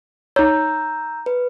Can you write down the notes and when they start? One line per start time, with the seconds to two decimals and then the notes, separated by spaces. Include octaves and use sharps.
0.36 D#4 C#5 A#5 E6 G6
1.26 B4